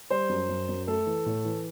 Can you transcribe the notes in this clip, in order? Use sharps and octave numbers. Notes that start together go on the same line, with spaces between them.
G3 C5
F#2
F#2
F#2
A3 A4
E3
A2
E3